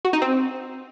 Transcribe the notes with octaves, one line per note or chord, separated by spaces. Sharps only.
F#4
D#4
C4